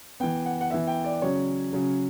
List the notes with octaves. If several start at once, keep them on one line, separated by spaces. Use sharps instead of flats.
E3 B3 G5
F#5
F#5
E3 B3 E5
G5
D5
C#3 F#3 C#4 C#5
C#3 F#3 C#4